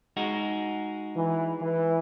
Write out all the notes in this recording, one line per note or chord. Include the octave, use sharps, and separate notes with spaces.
G#3 D#4 F#4
E3
E3